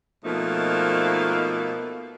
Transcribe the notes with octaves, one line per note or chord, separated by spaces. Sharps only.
B2 F3 A3 A#3 D#4